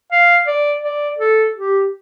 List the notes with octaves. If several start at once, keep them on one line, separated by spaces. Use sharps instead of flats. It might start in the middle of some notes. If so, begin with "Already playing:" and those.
F5
D5
D5
A4
G4